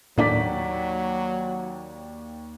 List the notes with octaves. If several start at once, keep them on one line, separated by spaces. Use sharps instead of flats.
D#2 A2 F#3 A#3 D4 D5 B6